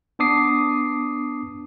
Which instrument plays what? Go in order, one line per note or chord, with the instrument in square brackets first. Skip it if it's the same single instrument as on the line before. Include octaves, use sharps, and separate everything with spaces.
[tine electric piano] B3 D4 A5 D6 D#6 C7